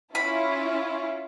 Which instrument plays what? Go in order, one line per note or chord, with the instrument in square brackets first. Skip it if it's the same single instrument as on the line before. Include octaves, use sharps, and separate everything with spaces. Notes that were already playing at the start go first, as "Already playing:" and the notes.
[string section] C#4 E4 F4 [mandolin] B5